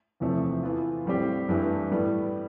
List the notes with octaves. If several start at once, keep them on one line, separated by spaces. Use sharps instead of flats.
E2 C3 F3 A3 C4
E3 B3 F4
A2 G3 C4 G4
G2 E3 A3 E4 G4
A2 G3 B3